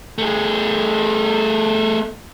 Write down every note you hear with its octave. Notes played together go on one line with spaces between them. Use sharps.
A3 G#4